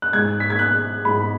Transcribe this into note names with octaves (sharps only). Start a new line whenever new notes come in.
F#6
G#2 G#3 G#6
B6
G#6
F#6
G#2 G#3 B5